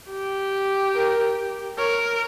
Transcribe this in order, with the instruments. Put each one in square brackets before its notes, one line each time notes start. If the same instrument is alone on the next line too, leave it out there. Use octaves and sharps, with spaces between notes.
[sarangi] G4
[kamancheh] A#4
[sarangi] A#4 [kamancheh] C#5